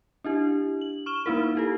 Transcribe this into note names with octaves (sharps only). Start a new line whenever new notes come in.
D4 E4 G4
F#7
C#6 F6 E7 G7
A#3 D#4 E4 A#4
E4 G4 A4